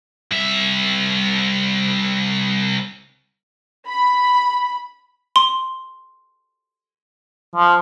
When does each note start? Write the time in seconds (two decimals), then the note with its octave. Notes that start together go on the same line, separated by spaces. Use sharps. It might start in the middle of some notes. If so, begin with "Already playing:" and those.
0.31 C2 E5
3.87 B5
5.36 C6
7.56 F3